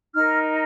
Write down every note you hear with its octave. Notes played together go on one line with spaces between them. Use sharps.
D#4 A#4 F6